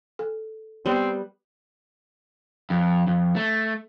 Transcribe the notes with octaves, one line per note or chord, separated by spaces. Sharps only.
A4
G3 B3 C4
F2
F2
A3